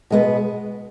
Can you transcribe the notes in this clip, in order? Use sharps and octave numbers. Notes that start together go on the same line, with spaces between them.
B2 G#3 B3